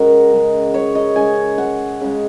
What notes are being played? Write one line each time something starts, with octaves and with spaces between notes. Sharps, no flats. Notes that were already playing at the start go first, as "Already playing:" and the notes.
Already playing: C#3 G#3 F#4 A#4
C#3 G#3
C#5
D#5
C#3 G#3 G#5
F#5
C#3 G#3